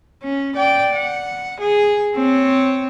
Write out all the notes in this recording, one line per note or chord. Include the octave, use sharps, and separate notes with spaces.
C#4
D5 G5
F#5
G#4
C4 C#5